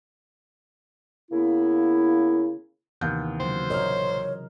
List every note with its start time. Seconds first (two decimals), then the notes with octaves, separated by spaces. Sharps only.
1.31 C#3 A#3 B3 E4
3.01 D#2 C3 E3 B3 G6
3.40 C#3 F#3 C5
3.70 A#1 A#4 C#5 D#5 F6